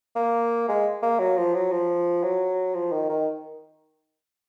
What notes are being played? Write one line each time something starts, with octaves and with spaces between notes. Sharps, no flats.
A#3
G#3
A#3
F#3
F3
F#3
F3
F#3
F3
D#3
D#3